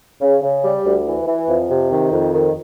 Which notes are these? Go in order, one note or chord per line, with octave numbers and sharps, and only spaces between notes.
C#3
C#3
G3
D2
E3
E3
F2
C3
D#3
F2
D#3